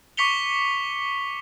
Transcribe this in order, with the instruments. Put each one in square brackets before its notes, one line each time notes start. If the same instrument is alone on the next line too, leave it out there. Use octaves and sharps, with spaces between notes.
[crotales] C#6 D6 B6 C#7 F7 G7